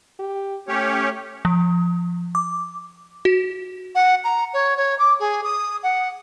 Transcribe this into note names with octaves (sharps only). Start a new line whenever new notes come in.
G4
A3 C#4 G4 C#5
F3
D6
F#4
F#5
A#5
C#5
C#5
D6
G#4
D#6
F#5